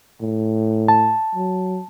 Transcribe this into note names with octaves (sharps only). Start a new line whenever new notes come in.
A2
A5
F#3